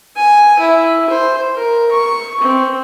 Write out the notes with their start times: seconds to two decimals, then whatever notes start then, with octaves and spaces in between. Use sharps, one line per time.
0.16 G#5
0.59 E4
1.09 C5
1.55 A#4
1.91 C#6
2.40 C4